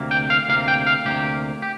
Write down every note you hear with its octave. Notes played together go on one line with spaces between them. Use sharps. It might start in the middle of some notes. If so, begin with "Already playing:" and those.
Already playing: D2 C3 A#3
G5
F5
D2 C3 A#3 F5
G5
F5
D2 C3 A#3 G4
G4